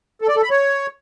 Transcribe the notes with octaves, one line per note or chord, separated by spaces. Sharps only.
A4
D5
A4
B5
C#5